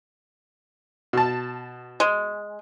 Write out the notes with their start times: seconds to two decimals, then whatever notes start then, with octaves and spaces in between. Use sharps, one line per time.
1.13 B2 A5
2.00 G#3